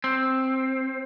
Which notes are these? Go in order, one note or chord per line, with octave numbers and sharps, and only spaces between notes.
C4